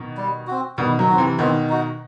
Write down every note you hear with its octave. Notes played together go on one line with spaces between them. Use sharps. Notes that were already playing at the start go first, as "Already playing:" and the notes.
Already playing: B2 D#3
G3
C4 F#4
B2 D#3 G3
D#3 F#3
C4 F#4
C3 E3
B2 D#3 C4
D#4 F#4